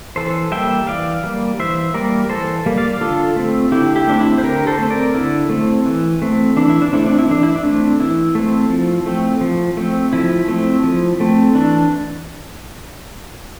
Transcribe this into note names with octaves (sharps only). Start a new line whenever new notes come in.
E3 A4 C5
G3 A#3 E5 G5
E3 D5 F5
G3 A#3
E3 C5 E5
G3 A#3 A#4 D5
E3 A4 C5
G3 A#3
D5 F5
D3 F4 A4
A3 C4
D3 E4 G4
E4 G4
A3 C4 D4
E4
C5
D3 G4 A#4
A4 C5
A3 C4
A#4 D5
D3 E4
A3 C4
E3
A3 C4
E3 D4
E4
D4
A3 C4 E4
D4
E4
E3 D4
E4
D4
A3 C4
E3 E4
A3 C4
F3
A3 C4
F3
A3 C4
F3 E4
A3 C4
F3
A3 C4
E3 D4